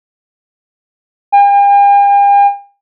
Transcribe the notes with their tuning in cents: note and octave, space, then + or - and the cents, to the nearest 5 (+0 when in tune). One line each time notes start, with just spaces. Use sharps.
G5 +45